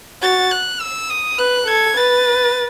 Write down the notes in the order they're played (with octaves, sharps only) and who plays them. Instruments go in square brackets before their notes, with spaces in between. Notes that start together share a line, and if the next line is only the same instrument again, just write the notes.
[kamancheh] F#4 [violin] A6
[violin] F#6
E6
D#6
[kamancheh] B4 [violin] F#6
[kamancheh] A4 [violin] G#6
[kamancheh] B4 [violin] A6